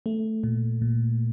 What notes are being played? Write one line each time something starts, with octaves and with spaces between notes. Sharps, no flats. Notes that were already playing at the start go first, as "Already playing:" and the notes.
A3
A#2
A#2